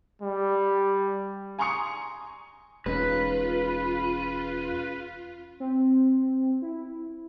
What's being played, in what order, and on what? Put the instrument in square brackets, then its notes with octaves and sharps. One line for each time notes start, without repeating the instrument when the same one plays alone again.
[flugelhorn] G3
[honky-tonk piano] G#5 A#5 C6 C#6 D#6 C#7
[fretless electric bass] E1 [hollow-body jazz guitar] G#3 C#4 D#4 [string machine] F4 [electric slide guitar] B4
[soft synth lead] C4
E4